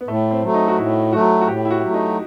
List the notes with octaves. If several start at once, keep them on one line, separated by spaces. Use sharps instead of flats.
B3
A2 A3
C4
F#3 A3
D#4
F#4
A2 E4
F#3 A3 F#4
F#4
A2 G4
E4
F#4
F#3 A3
D#4